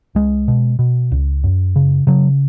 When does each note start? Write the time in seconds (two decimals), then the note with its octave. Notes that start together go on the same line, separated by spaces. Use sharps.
0.15 C#2 G#3
0.48 B2
0.79 B2
1.12 C#2
1.44 F#2
1.76 C#3
2.07 C#3 F#3